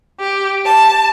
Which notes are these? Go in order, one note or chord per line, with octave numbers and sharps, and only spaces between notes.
G4
A5